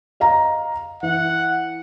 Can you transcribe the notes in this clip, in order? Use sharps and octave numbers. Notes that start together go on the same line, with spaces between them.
D#5 F5 A#5
E3 F#5